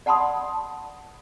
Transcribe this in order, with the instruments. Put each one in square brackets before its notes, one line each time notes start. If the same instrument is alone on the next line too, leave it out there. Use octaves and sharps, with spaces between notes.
[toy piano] D5 F#5 A5 B5 C6 D#6